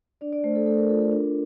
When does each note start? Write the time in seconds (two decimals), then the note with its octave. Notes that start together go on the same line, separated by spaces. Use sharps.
0.21 D4 D5
0.33 D5
0.44 A3 C5
0.55 A4
0.66 A3 A4
0.78 A#4
0.89 F4 A4
1.01 A4
1.11 D4 A#4